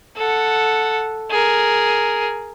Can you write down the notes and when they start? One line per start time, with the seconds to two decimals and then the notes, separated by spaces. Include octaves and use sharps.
0.16 A4 F#5
1.31 G#4 A#4